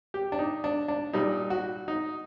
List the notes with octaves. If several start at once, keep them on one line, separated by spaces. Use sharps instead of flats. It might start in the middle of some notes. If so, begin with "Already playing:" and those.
G4
D4
D#4
D4
D4
A#2 G3 D#4
F#4
D#4